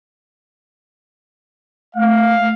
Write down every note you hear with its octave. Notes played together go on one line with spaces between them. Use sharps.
A3 F5